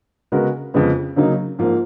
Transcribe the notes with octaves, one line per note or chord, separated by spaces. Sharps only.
C#3 G#3 B3 F#4 A#4
F2 C#3 G#3 B3
C#3 F#3 A#3 D#4
G#2 F3 A#3